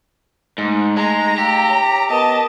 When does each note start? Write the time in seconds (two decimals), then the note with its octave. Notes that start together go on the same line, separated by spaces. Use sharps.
0.58 G#2 A3 D#4 C6
0.97 G#3 A#5
1.38 G4 F5 E6
1.69 C#5
2.10 B3 A#4 B4 D#5 A5